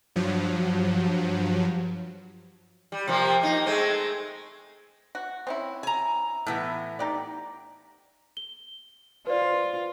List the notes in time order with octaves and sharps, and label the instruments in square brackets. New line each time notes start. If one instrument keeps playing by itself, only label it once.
[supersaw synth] G2 F3 F#3
[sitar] G3
C3 F3 A#3
A#3 D#4
G#3 A3 C4
[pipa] F#4
C4 C#4 E4
[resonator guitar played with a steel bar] G#5 A#5
A2 E3 B3
[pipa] D#4 G4 D5
[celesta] G7
[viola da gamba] F4 [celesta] B4 C5 D5